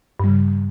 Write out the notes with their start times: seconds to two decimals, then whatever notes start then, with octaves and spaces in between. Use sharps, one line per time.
0.20 G2
0.24 G3
0.28 C#3